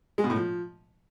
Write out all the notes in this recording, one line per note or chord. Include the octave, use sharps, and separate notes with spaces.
G#3
B2
A2
F3